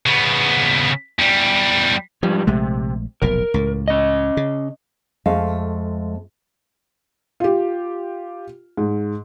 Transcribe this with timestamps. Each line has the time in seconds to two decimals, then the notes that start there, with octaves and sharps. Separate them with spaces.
0.06 C#3 B3
1.19 E2 G3
2.23 G#2 F3 G3
2.47 A#1 C3 G#3 A3
3.22 F1 B1 A#2 A#4
3.54 C#2 A2
3.88 C#4 D#5
4.37 C#3
5.26 F2 G#3 A3 F5
7.40 F4 G4
8.77 G#2